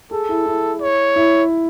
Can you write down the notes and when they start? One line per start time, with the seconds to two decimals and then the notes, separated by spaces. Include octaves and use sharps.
0.11 G#4 A4
0.29 E4
0.46 E4
0.81 C#5
1.16 E4